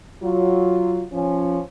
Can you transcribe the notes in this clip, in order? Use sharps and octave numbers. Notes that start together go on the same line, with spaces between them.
F#3 F4
F3 C#4